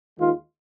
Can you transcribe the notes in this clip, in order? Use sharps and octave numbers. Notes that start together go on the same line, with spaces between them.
D#2 D#3 G#3 F4